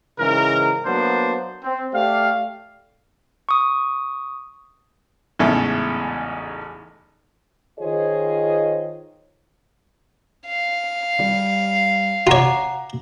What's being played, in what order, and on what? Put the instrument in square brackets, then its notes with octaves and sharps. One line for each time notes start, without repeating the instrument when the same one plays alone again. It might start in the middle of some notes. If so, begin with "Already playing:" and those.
[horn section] G#2 C#3 E3 A#4
F#3 A#3 B3 D4 C5
C4
A3 G4 D5 F5
[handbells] C#6 D#6
[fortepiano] A1 E2 G#2 C#3 A4 E5
[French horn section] D#3 F4 G#4 C5 C#5 D#5
[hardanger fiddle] F5
[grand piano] G3 G4
[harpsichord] F4 C#5 [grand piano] F#5 A#5 D6